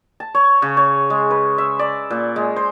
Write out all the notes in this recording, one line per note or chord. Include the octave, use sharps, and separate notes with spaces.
A5
C#5
C#3
C#5
G#3
B4
E5
D5
A#2
G#3
C5